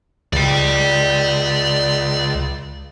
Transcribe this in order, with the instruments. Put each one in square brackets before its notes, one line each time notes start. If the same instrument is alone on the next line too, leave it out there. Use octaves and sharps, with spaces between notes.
[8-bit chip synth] C#2 [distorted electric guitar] D5 G5